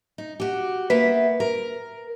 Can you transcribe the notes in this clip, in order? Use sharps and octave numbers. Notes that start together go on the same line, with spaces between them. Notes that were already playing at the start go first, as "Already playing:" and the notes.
D#4
F#4 G4
A#3 B3 B4 E5
A#4